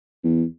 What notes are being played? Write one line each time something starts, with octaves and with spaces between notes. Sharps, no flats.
E2